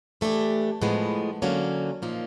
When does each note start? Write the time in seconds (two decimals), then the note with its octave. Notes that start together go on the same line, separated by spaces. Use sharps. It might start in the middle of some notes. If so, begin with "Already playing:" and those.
0.21 E3 A3 D4 G4
0.82 A2 F3 G#3 B3
1.42 D3 F#3 A#3 C#4 F#4
2.02 A#2 F3 A#3 D#4